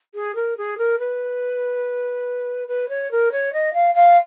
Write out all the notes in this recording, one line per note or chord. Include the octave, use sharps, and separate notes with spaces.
G#4
A#4
G#4
A#4
B4
B4
C#5
A#4
C#5
D#5
F5
F5